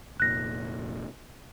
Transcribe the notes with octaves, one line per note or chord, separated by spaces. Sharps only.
F1 A#2 F#6 A#6